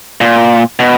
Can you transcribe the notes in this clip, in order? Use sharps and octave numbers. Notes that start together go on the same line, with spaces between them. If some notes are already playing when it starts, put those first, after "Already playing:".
A#2
B2